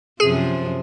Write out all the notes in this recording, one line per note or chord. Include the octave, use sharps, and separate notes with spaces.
F#2 C3 F3 G#4